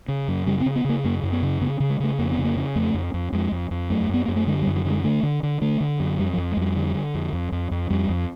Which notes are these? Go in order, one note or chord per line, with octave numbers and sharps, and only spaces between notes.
C#3
F#2
C#3 G3
C4
C#3
B3
C#3 A#3
F#2 A#3
F#2
B3
C#3
C#3 B3
C#3
G#3
C#3 A3
F2 A#3
B3
C#3
A#3
C#3
F2 A3
F2
F2
F2 G#3
F2
F2
F#2 A3
F#2 B3
F#2 A#3
A3
D3 G#3
G3
F#2
F#3
D3
G#3
D3 A3
D3
D3
D3 A3
D3
F#2
F2 G3
F3
F2
G#3
F2 G3
D3
D3
F2
F2
F2
F2
F2 G3
F2